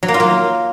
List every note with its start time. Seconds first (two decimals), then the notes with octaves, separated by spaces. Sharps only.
0.03 F#3
0.08 A#3
0.14 F4
0.20 A#3